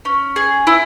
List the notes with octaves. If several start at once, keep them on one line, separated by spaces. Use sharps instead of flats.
C#4
G#4
E4